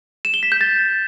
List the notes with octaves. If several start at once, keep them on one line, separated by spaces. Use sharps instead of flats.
E7
G7
B6
G6
A6